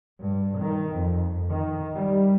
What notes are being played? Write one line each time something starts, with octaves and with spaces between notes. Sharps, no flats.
G2
D#3
F2
D#3
G3